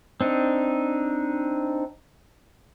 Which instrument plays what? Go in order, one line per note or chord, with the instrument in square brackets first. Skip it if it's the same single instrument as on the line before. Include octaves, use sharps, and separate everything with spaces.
[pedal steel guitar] C4 D4 D#4